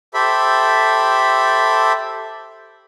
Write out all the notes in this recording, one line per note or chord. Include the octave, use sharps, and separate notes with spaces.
G4 A4 C5 E5 B5